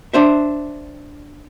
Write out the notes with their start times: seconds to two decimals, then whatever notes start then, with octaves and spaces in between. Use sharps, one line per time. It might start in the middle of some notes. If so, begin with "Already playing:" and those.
0.14 D4 C5 E5